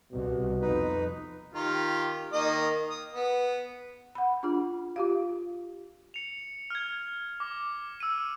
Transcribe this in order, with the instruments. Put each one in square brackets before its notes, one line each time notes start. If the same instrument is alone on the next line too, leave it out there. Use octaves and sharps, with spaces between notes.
[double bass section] C2 [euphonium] B2
[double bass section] F2 [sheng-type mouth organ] D#4 B4
[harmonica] D#3 F4 G4
D#3 A#3 D#5
D#6
B3
[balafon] F#5 B5
D4 F4 G#4
F4 G4 F5
[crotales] C#7 F7
F6 G#6
D6
E6 D#7